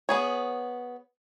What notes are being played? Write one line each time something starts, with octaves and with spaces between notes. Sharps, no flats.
B3 G#4 C#5